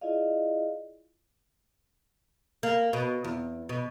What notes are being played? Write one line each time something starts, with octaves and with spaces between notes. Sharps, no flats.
E4 F4 G#4 D5 D#5 F5
A#3
B2
E2
B2